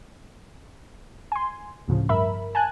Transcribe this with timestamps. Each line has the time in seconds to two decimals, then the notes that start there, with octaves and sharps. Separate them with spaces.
1.32 G#5 C6
1.88 D2 A2 C#3 F3
2.09 G2 A#4 E5 B5
2.55 G#5 A5 F#6